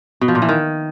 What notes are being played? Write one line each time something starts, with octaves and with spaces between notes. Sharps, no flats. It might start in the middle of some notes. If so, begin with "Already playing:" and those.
B2
F3
A#2
E3
D#3